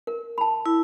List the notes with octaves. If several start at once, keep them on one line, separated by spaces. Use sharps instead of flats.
A#4
A5 B5
E4